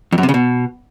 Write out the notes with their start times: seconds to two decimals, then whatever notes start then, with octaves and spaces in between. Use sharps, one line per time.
0.12 F2
0.18 F#2
0.23 C3
0.29 C#3
0.34 B2